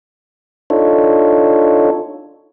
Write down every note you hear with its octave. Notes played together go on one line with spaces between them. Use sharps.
D4 D#4 F4 A4 C#5